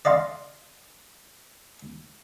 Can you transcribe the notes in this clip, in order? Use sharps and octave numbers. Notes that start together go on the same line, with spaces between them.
D5 D#5 F5 C6